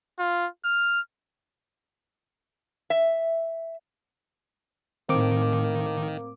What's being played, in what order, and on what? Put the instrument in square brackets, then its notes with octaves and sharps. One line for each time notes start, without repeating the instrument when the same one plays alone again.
[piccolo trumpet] F4
F6
[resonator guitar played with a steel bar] E5
[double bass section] A2 [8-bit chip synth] D#3 [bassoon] A#3 [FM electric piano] C4 D6